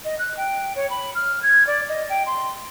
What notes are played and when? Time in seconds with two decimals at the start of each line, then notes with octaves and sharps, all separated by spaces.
0.05 D#5
0.19 F#6
0.37 G5
0.76 C#5
0.90 B5
1.15 F6
1.43 G#6
1.67 D5
1.89 D#5
2.10 G5
2.26 C6